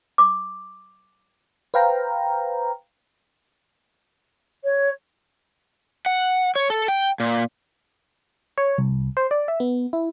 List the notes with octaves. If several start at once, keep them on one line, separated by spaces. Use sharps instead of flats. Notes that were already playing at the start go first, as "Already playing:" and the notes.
D6
B4 C5 F5 G5 A#5
C#5
F#5
C#5
A4
G5
A#2
C#5
C2
C5
D5
E5
B3
E4